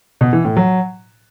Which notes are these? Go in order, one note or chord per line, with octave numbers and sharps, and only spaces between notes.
B2
E3
A2
F#3